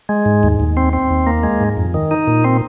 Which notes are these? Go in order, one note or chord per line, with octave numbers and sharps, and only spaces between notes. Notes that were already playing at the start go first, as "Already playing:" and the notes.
G#3
G#2
D#2
D#2
C4
C4
D#2
A#3
G#3
G#2
F2
D#3
D#4
A#2
C4